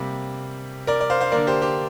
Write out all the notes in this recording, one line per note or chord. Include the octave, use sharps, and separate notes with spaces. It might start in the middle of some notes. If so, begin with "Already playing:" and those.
Already playing: C3 G3 A#3
A#4 D5
D5
C5 F5
C5 F5
D3 A#3 A#4 D5
G4 C5
G4 C5